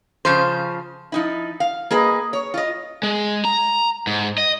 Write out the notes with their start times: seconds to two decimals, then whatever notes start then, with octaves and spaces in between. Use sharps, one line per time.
0.25 C#3 F3 C5
1.12 F3 D#4 E4
1.60 F5
1.91 A#3 G#4 B4 D#5
2.33 C#5
2.54 F4 D#5
3.03 G#3
3.45 A#5
4.07 G#2
4.38 D#5